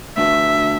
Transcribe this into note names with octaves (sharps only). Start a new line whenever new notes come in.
D3 A3 D4 F#4 B4 E5